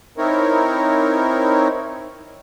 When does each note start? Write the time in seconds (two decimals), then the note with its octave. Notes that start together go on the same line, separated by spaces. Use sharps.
0.18 C4 D#4 E4 A#4 C#5